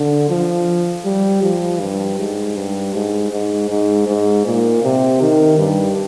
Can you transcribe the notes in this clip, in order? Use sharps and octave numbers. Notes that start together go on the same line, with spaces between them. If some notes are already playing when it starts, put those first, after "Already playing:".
Already playing: D3
F3
G3
F3
G2
G#2
G2
G#2
G#2
G#2
G#2
A#2
C3
D#3
G2